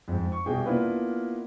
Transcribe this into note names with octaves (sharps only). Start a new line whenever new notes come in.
F2 G#2
C#6
C2 B2 G4 G#4 G5
A#3 B3 D4 E4 F4 B4